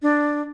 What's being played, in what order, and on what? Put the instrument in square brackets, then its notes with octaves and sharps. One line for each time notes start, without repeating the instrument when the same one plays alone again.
[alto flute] D4